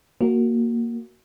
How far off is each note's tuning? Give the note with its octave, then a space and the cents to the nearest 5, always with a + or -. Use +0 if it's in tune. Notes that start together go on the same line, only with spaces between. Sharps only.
A#3 +0 F#4 +0